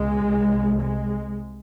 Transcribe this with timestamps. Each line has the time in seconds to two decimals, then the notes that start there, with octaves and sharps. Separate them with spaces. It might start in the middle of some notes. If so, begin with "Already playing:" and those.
Already playing: C#2 B2 G#3
0.28 C2 C3
0.80 G#3